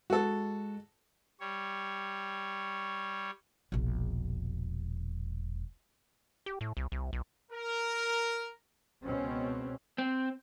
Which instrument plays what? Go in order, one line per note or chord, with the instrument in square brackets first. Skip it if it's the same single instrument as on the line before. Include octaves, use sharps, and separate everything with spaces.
[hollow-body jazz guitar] G#3 [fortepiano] F#4 A4
[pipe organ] G3 C#5
[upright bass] E1 A#1
[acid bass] G4
A2
C2
C2
B1
[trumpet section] A#4
[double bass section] C#2 B2 C4 C#4
[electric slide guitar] C4